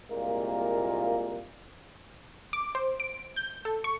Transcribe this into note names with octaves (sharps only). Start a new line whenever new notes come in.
C2 A#2 G#3 A#3 F4 A#4
D6
C5
D7
G6
A4
C#6